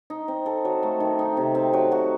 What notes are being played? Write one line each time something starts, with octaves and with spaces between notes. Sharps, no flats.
D#4
C4
A4
F#3
A3
D#3
D#4
C3
C4
F#3
F#4